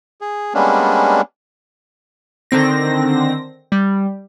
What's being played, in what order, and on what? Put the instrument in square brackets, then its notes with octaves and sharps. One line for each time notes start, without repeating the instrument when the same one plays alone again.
[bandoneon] G#4
G3 G#3 A#3 B3 C#4 D4
[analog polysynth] D3 D#3 C4 A#6
G3